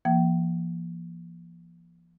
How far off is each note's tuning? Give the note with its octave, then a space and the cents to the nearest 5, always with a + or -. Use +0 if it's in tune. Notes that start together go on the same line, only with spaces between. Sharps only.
F3 -40 A#3 +25 G5 -35